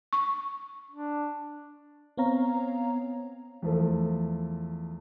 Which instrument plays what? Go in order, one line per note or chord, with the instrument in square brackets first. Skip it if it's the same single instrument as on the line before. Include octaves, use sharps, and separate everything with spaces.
[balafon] C#6
[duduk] D4
[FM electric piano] B3 C4 C#5 F5 A#5
[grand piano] E2 F3 A3